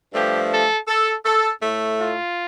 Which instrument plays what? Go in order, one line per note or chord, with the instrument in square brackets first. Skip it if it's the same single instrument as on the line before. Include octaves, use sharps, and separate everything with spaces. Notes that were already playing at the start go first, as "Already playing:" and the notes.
[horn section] G2 F3 A3 G4
A4
A4
A4
A2 A3
F4